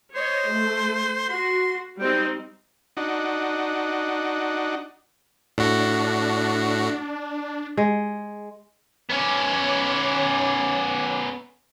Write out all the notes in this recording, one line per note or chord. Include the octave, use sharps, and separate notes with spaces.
C5 C#5 D#5
A3
F#4 C6
G3 C4 D#4 G5
D4 D#4 F#4
A2 D4 F#4
G#3
B3 C#4 C#5 D6